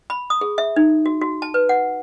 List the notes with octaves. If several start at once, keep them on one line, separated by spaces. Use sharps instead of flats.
B5
D#6
G#4
E5
D#4
F#4
F#4
A5
B4
F#5